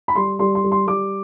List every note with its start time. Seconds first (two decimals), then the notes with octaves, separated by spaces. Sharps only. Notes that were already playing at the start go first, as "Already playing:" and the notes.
0.08 B5
0.15 G3 C6
0.39 G3 C6
0.55 C6
0.64 G3
0.72 C6
0.87 G3 D6